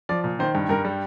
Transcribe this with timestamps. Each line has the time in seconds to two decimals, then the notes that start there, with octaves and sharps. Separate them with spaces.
0.09 F3 D5
0.24 A#2
0.39 D#3 C5
0.55 G2
0.69 G2 A#4
0.85 G3